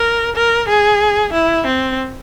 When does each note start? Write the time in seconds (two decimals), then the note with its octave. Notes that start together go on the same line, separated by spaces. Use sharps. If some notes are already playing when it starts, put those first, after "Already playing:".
Already playing: A#4
0.35 A#4
0.68 G#4
1.33 E4
1.66 C4